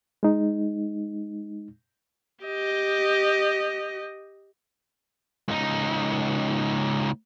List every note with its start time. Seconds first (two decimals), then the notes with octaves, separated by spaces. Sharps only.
0.23 G#3 D#4
2.44 G4 D#5
5.48 C#2 D#4